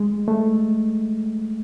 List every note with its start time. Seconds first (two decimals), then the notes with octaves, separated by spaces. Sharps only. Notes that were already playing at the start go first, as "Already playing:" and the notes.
Already playing: G#3
0.28 A3